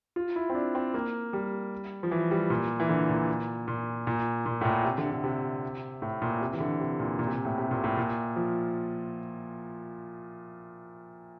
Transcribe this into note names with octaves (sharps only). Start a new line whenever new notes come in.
F4
E4
C4
D4
C4
A#3
G3
F3
E3
G3
A#2
E3
D3
A#2
A#2
A#2
A#2
A2
A#2
C3
D3
D3
C3
A2
A#2
C3
E3
D3
C3
A#2
A#2
C3
A#2
A2
C3
A#2
A2
A#2
F3